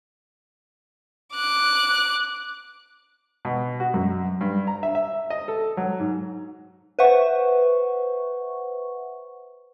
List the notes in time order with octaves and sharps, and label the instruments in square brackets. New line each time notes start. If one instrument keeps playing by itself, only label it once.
[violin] D6 F#6
[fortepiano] B2
F#4
F#2
G2
A#5
E5
E5
D#5
A4
F#3
G#2
[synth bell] B4 C5 E5 F#5 C#6